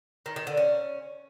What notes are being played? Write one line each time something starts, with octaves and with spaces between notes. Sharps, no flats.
D#3
D#3
D3
C#4